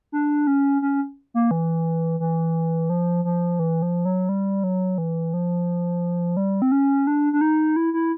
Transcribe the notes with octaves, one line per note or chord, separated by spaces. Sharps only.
D4
C#4
C#4
A#3
E3
E3
F3
F3
E3
F3
F#3
G3
F#3
E3
F3
G3
C4
C#4
D4
D4
D#4
E4
E4